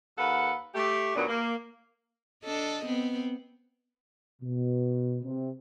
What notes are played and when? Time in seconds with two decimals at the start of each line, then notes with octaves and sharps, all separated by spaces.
0.18 D#2 A4 B4 F5 F#5
0.75 A3 G4
1.16 D#2 A#2 F#3 B3 D4
1.28 A#3
2.44 D4 A4 D#5
2.85 B3 C4
4.42 B2
5.23 C3